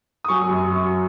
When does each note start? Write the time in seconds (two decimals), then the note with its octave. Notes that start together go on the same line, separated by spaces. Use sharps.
0.24 D#6
0.28 F#3 G#5 C#6
0.50 F#2
0.72 F#2